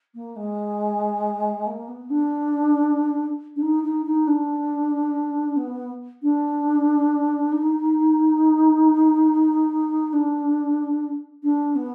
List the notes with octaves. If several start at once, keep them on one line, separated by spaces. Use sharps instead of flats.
A#3
G#3
A#3
B3
D4
D4
D#4
D#4
D#4
D4
B3
D4
D#4
D4
D4
B3